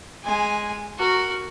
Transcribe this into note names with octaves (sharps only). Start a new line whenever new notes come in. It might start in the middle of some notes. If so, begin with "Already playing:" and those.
G#3 G#5
F#4 A#4